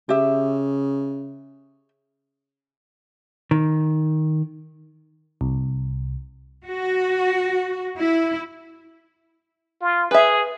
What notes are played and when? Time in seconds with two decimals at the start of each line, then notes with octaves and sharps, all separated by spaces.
0.09 C#3 G4 E5
3.51 D#3
5.41 C2
6.67 F#4
7.97 E4
9.81 F4
10.11 G#4 B4 E5